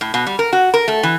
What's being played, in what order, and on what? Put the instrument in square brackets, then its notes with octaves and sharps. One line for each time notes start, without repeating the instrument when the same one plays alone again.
[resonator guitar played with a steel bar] A2
B2
G3
A#4
F#4
A#4
A3
E3